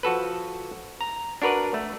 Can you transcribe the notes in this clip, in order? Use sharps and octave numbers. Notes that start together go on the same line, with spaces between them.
F3 F#4 A4 B4
A#5
D4 F#4 A#4 B4 D5
A3